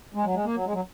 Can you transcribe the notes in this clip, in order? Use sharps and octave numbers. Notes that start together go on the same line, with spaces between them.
G#3
F#3
G#3
A#3
F#3
G#3
F#3